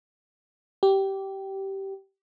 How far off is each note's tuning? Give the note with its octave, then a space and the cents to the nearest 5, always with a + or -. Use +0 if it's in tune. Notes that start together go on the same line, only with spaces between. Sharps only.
G4 -15